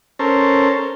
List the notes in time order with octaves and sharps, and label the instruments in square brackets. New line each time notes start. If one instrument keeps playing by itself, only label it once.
[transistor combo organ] C#4 A4 A#4 C5